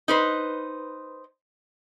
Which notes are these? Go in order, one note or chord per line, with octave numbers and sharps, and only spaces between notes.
D#4 B4 C5